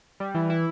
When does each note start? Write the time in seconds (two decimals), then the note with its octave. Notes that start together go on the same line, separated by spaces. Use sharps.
0.20 G3
0.35 E3
0.50 E4